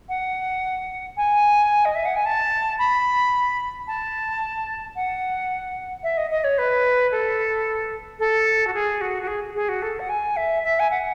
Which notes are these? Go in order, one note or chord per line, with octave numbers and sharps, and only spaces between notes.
F#5
G#5
D#5
E5
F#5
G#5
A5
B5
A5
F#5
E5
D#5
D#5
C#5
B4
A4
A4
F#4
G#4
F#4
F#4
G#4
G#4
F#4
A4
F#5
G#5
E5
E5
G#5
F#5